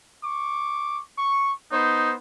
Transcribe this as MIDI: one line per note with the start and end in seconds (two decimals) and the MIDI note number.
0.23 1.01 85
0.23 1.01 86
1.18 1.52 85
1.72 2.14 59
1.72 2.11 63
1.72 2.14 72